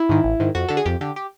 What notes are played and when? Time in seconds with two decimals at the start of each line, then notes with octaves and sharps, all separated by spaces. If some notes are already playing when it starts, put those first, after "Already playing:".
Already playing: E4
0.09 G#2 D#3
0.24 A1
0.40 G#2 D#3
0.55 F2 F#4
0.68 D3 A4
0.77 G#4
0.86 F2 G4
1.01 D3 G4
1.16 G4